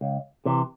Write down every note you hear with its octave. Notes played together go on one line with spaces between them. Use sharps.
C#2
C3 E3